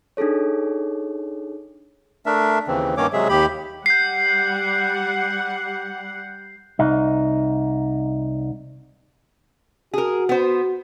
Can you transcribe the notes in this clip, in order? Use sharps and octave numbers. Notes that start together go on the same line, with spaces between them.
D4 D#4 G#4 A4 C#5
A3 D4 A#4 E5
D#2 C#3 E3 C4
G2 D#3 A#3 C#4 C#5 D6
C3 F#3 G#3 G#4 E5
D#2 G4 B5
G3 F#5 G6 C7
C2 D#4
F#4 G#4 A#4
B3 C5